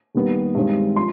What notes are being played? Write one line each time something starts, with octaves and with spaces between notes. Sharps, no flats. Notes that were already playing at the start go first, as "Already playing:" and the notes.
D#2 D#3 G3 B3
G2 D#3 G#3 C4
F3 C6